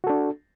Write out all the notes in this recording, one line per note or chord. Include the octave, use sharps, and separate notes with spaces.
D4 F#4 A4